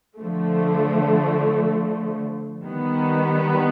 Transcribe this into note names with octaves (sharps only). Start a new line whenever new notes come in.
D3 F3 A3
D#3 G3 B3